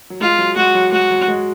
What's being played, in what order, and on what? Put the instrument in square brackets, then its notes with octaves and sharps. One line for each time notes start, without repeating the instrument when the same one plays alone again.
[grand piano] F#3
[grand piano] G#3 [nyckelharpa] F4
[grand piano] F#3
[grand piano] G#3 [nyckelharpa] F#4
[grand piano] F#3
[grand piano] G#3 [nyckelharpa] F#4
[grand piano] F#3
G#3